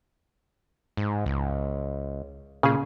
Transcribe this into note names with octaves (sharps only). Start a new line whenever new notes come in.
G#2
C#2
A#2 C#3 G#4